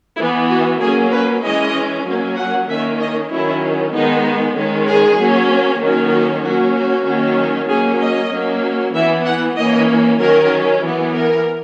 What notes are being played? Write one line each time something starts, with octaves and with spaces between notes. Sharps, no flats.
E3 B3 E4
F#4
F#3 A#3 C#4 G#4
B4
E3 G#3 C#4 D#5
F#3 A#3 C#4
F#5
D#3 A#3 C#4 E5
D#5
D#3 F#3 C#4 E4
D#3 G#3 B3 D#4
D#3 G#3 C#4
G#4
F#3 A#3 C#4
D#3 F#3 A#3 C#4
F#4
F#3 A#3 C#4 F#4
F#4
D#3 F#3 A#3 C#4
F#3 A#3 C#4 G#4
D#5
F#3 A#3 C#4
E3 B3 E5
F#5
E3 A#3 C#4 D#5
D#3 F#3 C#4 A#4
E3
B3
A#4